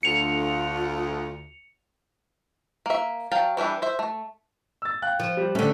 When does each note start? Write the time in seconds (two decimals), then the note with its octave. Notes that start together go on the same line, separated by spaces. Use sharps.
0.03 D2 F4 C#7 F7
2.86 A#3 E5
3.32 F#3 F5 G5 A5
3.57 E3 G3 D4 E5
3.82 C5 E5
3.99 A3
4.82 E6 A6
5.02 F5 G5 F#6
5.20 F3
5.37 G3
5.55 D3 A3 C#4 G4